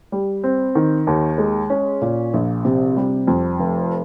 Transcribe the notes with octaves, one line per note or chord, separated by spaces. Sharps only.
G3
C4
D#3
D#2
G#3
C#4
A#2
A#1
C3
G3
F2
F1